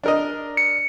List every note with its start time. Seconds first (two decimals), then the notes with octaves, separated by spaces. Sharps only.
0.04 D4 A#4 D#5
0.57 C#7